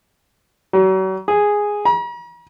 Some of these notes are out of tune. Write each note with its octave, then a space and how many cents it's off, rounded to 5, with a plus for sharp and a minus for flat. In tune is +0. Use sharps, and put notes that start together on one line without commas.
F#3 +40
G#4 -5
A#5 +45